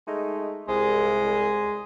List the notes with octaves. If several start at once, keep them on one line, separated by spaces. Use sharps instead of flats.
G#3 A3 D#4
C2 G#3